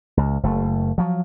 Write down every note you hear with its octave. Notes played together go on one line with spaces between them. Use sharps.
C#2
F#1 A3
F3 F#3